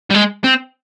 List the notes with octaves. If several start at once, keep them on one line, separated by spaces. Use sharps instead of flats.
G3
G#3
C4